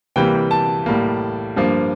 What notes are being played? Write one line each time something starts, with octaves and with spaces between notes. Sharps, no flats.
C3 E3 G3 A#3 G5
A5
A2 G3 A#3
G2 F3 A#3